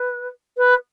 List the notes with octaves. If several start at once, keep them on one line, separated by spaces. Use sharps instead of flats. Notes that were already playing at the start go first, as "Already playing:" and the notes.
Already playing: B4
B4